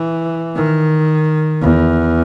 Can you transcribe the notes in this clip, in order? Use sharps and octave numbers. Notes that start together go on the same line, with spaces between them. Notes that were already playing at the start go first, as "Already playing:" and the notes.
Already playing: E3
D#3
E2